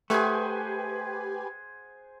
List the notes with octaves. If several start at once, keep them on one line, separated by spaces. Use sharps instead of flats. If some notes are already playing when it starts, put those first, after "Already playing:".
A3 G4 G#4 B4 C5 F#5 G#5